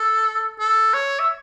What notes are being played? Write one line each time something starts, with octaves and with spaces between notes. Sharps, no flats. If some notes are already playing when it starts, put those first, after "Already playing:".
Already playing: A4
A4
C#5
E5